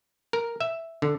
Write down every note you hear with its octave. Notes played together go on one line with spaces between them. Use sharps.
A#4
E5
D3